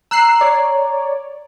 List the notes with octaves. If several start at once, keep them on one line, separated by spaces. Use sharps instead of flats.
A#5 E6 F#6 C7
C#5 D5